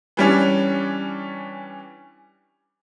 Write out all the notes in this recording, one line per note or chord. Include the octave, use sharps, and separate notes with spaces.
E3 G3 C#4 D4